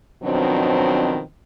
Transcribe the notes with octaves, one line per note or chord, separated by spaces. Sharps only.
B2 D#3 F3 F#3 C4 D4